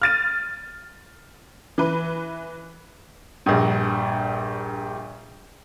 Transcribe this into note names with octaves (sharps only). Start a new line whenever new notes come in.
F6 A6 D#7
E3 B4
A#1 G2